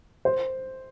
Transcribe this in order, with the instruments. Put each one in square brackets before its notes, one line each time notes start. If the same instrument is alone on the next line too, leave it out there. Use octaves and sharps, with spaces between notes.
[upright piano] C5